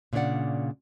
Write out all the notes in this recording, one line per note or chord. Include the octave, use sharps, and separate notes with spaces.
A#2 C#3 D4 G4 D5 F#5